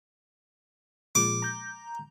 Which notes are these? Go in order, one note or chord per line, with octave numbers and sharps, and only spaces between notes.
A#2 F3 G#3 D6
A#5 G6